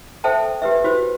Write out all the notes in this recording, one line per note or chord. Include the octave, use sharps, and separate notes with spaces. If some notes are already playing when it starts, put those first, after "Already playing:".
A4 C5 E5 G5 A5
G4 B4 E5
F#4 G4 B4 C5